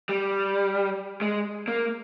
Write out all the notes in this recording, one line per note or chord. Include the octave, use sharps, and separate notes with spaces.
G3
G#3
A#3